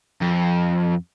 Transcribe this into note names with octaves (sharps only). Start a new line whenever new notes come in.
F2